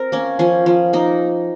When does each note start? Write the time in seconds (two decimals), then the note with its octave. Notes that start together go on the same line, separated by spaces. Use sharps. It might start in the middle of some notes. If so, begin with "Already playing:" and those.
Already playing: C4 A#4
0.12 A#3 C#4
0.39 F3 C#4
0.66 F3
0.93 A#3 D#4